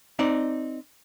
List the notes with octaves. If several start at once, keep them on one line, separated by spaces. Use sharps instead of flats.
C4 D#4 D5